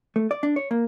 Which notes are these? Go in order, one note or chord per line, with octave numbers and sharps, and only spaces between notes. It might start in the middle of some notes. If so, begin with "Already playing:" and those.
A3
D5
D4
C#5
A#3